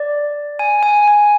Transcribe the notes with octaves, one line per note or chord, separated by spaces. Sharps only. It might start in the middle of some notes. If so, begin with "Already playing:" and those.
Already playing: D5
G#5
G#5
G#5